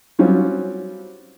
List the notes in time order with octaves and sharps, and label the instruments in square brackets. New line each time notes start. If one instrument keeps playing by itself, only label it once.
[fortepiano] F#3 G3 C4 C#4 F4